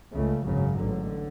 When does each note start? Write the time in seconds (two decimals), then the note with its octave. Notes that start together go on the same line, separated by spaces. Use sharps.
0.13 C#2 C#3 A3
0.46 G#1 F#2 C#3 F#3
0.79 A1 G#2 D3